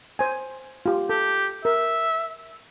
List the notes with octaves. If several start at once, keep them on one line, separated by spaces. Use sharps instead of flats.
C5 G#5
F4 G4
G4 A4
A#4 E5